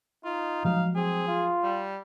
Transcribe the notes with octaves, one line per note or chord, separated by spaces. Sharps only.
D#4 F4
F3 F#3 G#3 F5
C4 G#4
F4
G3